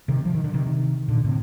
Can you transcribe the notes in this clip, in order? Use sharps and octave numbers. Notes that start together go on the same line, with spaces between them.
C3 D#3
F3
D#3
D3
C3 D#3
A#2 D3
A2 C3